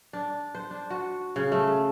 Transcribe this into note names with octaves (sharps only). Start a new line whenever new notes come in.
D4
C5
D4
F#4
C#3
A3